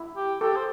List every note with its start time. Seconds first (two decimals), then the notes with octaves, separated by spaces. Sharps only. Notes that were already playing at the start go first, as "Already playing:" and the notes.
Already playing: E4
0.16 G4
0.41 G4 A4
0.56 C5